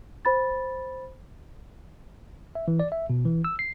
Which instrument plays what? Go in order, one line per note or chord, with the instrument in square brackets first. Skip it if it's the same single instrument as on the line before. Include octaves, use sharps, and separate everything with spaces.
[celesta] C5 B5 A6
[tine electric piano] E5
E3
D5
E5
B2
E3
E6
C7